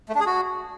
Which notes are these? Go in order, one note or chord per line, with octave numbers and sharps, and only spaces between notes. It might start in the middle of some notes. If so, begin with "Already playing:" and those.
A3
D4
G#4
F#4